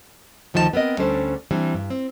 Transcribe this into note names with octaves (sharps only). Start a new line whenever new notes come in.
D2 D#3 F3 D#4 E4 A5
B3 C4 A#4 D#5
D2 G3 C#4 D4 A4 C5
E3 G3 C4 D4
G2
C4